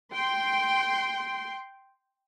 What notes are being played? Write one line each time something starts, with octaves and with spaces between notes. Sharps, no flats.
G5 C6